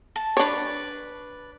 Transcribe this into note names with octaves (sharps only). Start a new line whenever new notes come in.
A5
D4 B4 C#5 D5